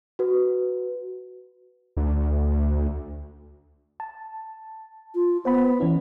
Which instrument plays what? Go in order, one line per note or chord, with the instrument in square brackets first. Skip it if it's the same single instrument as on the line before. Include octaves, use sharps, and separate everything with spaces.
[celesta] F#4 B4
[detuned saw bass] D2
[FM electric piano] A5
[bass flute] F4
[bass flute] B3 [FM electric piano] C5 F#5 B5
[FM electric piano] E3 C#4 E4